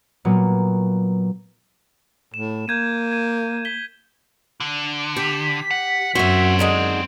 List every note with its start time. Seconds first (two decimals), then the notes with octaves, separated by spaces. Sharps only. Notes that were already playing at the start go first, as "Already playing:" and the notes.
0.25 A#2 F#3 A#3 B3
2.34 A2 E7
2.68 A#3 G6 G#6 D#7
3.12 G#6 D#7
3.65 B6 G7
4.60 D3
5.16 G4 B6
5.71 F#5
6.15 F#2 C4 F#4 C#5 E5
6.59 D3 D#3 G#3